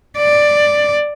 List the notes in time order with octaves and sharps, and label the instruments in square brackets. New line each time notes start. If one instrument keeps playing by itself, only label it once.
[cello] D5